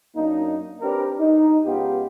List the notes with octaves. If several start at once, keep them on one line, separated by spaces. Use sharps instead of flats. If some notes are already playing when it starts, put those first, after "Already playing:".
F#2 A#3 D4 D#4
C4 D4 G4 A#4 B4
D#4
C#2 B3 F4 G4